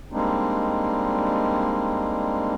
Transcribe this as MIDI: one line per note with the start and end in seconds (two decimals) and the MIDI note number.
0.12 2.55 55
0.12 2.55 56
0.12 2.55 58
0.12 2.55 60
0.12 2.55 62
0.12 2.55 63